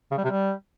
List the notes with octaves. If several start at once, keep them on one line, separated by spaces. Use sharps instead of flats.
C#3
G3
C3
G3